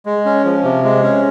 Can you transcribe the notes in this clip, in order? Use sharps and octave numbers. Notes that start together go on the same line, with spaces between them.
G#3
C#4
F3
C3
G#3
C#4